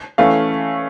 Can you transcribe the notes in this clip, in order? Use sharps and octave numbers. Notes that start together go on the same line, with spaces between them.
E3 A3 C#4 F5